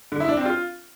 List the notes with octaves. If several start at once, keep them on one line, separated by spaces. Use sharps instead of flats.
D3
E4
D4
C4
F4